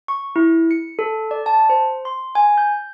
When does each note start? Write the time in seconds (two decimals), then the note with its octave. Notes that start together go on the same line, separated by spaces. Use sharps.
0.08 C#6
0.36 E4
0.71 C#7
0.99 A4
1.31 D5
1.46 A5
1.70 C5
2.05 C6
2.35 G#5
2.58 G6